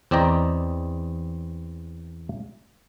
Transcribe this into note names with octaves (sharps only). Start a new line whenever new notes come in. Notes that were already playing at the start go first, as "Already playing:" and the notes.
E2 C4 D5 D#5 G5 A#5